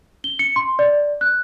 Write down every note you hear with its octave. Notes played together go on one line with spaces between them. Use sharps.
G7
C#7
C6
D5
F#6